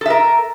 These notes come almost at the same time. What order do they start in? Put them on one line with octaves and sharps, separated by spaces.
A4 E5 A#4